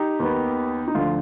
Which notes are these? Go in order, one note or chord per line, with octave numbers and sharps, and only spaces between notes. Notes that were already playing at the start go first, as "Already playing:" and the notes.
Already playing: D#4 G4
D#2 D#3 B3
D#4
D2 D3 F3 F4